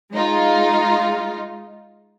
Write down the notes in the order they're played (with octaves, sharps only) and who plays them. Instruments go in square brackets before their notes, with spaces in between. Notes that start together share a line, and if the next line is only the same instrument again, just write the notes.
[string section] G#3 D#4 F4